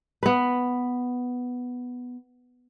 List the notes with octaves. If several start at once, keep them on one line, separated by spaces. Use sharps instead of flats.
B3 B4